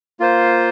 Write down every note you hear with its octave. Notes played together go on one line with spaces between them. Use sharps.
A#3 F4 C5